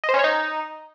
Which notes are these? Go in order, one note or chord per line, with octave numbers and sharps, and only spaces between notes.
D#5
C5
C#4
C#5
D#4